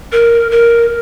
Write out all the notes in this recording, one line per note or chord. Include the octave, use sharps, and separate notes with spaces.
A#4
A#4